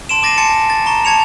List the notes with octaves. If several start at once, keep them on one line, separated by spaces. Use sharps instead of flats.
A5 C6 D7 E7
D6 A6 A#6 C7 D#7
G#5 A5 C6 A6 C#7
A6
A#5 C#6 E7
A5 G#6 C#7 F7